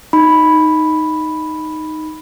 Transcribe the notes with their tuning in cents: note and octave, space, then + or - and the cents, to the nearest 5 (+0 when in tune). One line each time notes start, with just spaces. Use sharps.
D#4 +0 B5 +0